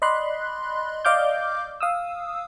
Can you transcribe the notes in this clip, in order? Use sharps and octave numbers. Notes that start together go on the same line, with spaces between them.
D5 D#5 B5 C6 F#6
D5 D#5 F5 D6 F6 G6
F5 D#6 E6